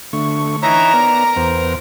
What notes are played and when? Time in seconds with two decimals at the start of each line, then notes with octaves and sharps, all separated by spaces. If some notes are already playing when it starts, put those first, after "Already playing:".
0.13 D3 A3 C#6
0.62 E3 D#4 C#5 E5 A#5
0.94 B3 A#4 D5
1.36 E2 B3 C5